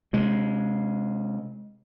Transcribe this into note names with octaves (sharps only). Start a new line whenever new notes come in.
C3 G#3